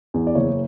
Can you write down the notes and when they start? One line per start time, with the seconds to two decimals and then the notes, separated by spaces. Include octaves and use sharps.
0.14 E2
0.27 D5
0.35 F#1 C#5